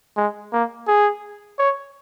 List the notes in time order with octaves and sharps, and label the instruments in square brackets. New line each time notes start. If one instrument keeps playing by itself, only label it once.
[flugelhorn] G#3
A#3
G#4
C#5